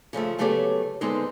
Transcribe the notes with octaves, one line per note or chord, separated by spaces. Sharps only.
C#3 F3 G#3 A3
C#3 F#3 A3 B3 G4 C#5
D3 G#3 B3 C4 D#4 C5